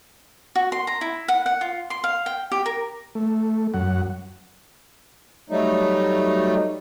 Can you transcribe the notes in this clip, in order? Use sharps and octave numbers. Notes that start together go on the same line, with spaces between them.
F#4
C6
A#5
E4
F#5
F#5
F4
C6
F5
G5
G4
A#4
A3
F#2 F#5
F#3 G3 A3 D#4